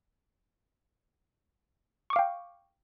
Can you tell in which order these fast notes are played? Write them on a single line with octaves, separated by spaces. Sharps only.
C#6 D6 F5 G5